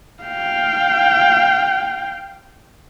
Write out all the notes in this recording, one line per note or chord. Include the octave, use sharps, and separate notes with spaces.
F5 G5